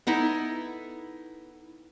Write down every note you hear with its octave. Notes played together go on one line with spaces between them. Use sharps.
B3 D#4 E4 A4